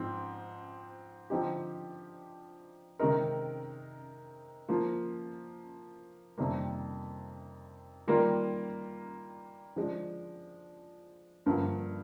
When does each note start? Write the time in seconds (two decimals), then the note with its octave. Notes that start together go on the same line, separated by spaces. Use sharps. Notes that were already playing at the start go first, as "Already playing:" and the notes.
Already playing: G#2 F3 C4
1.30 D3 F3 C4 D#4 G4
2.99 C3 D#3 G#3 D#4 A#4
4.69 F3 A#3 F4
6.38 F2 C3 D#3 G3 A#3
8.08 D#3 G3 A#3 F4 A#4
9.76 F3 G#3 D4
11.46 G2 D3 F3 A#3